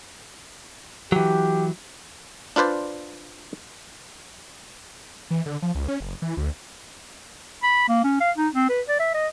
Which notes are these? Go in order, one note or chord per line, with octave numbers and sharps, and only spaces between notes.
E3 F#3 G4
D4 F4 B4 C5 D5
E3
D3
F3
C#2
C#4
F#1
E3
D2
B5
A#3
C#4
F5
D#4
C4
B4
D5
E5
D#5